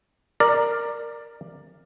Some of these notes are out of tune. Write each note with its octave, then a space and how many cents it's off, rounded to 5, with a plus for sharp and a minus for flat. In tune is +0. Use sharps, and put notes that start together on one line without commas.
A#4 +0 D5 +10